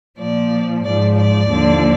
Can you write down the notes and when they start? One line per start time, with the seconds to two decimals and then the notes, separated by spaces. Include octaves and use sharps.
0.19 A#2 F3 D5
0.84 G#2 F3 D5
1.17 D5
1.49 D#2 D3 F3